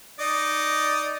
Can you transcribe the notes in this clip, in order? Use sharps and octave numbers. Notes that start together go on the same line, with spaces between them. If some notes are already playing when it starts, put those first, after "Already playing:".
D#4 D5 D#5